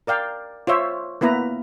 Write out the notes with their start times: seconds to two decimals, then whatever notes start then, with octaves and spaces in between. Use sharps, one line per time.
0.07 A#4 D5 F5 G5
0.67 F4 C5 C#5 E5
1.21 A#3 B3 E4 B4 A#5